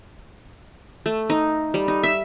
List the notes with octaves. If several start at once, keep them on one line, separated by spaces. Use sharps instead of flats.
A3
D#4
G3
D#4
E5